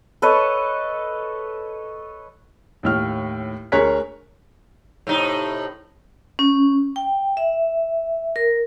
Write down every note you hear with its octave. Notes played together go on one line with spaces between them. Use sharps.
A4 B4 C#5 D#5
D#2 A2 F6
D2 G#4 A#4 C#5 F#6 B6
A2 C3 D#4
C#4
G5
E5
A#4